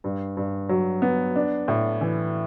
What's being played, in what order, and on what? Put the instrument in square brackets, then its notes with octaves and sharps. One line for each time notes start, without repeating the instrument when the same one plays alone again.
[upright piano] G2
G2
F#3
B3
D4
A2
E3